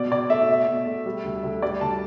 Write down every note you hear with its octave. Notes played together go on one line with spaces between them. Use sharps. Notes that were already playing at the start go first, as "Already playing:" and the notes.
Already playing: B2 D5
B2 D5
A3 E5
B2
B2
A3
G3
D2
D2
G3 D5
D2 A5